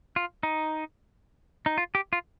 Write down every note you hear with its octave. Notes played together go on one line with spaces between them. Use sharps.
F4
D#4
D#4
F4
G4
F4